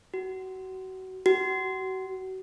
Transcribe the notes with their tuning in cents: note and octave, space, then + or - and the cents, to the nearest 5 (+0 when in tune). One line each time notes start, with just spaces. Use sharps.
F#4 +25
F#4 +30